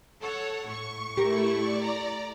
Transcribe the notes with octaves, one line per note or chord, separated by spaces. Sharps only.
A4 C#5 F#5
A2 C#6
A3 E4 G4 A#4
D5
A#5